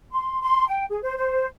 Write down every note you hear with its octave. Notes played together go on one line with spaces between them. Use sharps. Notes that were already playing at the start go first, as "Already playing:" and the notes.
C6
C6
G5
G#4
C5
C5